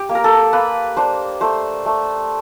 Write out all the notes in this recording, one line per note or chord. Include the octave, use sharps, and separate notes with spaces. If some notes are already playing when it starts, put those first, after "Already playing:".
Already playing: G4
A#3
A#4
A4
A#3 B4
D4 C5
A3 C5
A3